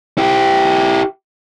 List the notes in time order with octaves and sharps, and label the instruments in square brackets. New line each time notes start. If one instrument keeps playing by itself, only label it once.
[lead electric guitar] E4 G4